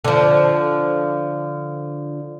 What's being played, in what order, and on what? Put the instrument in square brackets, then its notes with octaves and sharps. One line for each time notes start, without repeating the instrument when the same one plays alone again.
[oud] D3 F3